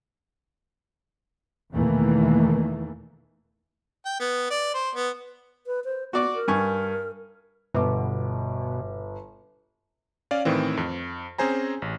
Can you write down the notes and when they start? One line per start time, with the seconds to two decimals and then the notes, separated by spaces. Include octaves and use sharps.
1.72 E2 B2 D#3 E3 A3 A#3
4.05 G5
4.20 B3
4.50 D5
4.74 C5
4.95 B3
5.67 B4
5.84 C5
6.13 B3 F#4 D5 C#6
6.35 A#4
6.48 G2 G#5 C#6
7.74 G1 B2 D6
10.31 C#4 D5 F5
10.45 A2 D#3 E3 C4
10.77 F2
11.38 C4 C#4 G#4 C5 G#5 A#5
11.82 A1